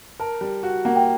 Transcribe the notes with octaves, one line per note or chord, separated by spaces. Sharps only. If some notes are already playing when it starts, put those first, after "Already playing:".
A#4 A5
G3
F#4
A#3 F#5
G5